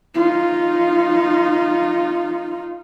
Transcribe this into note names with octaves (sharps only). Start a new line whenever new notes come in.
D#4 F4